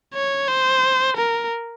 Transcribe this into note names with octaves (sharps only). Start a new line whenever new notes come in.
C#5
C5
A#4